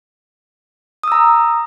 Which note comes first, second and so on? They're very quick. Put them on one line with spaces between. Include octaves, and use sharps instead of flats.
D#6 E6 A#5